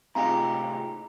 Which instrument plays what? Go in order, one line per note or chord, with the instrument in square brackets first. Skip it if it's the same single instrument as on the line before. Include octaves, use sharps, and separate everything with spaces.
[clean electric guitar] A2 D#4 G4 [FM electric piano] C3 F4 G#4 [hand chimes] A#5